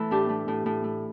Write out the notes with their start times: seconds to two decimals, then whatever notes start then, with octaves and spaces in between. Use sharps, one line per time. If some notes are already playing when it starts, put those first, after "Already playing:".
Already playing: E3 A3 E4 A4
0.11 A2 D4 G4
0.29 A3
0.48 A2
0.66 A2
0.84 A3